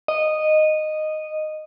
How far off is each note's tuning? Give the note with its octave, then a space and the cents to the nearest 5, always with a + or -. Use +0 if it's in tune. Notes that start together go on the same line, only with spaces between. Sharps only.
D#5 -10